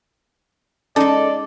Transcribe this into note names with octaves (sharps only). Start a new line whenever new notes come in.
G#3 C#4 D#4 A4 D5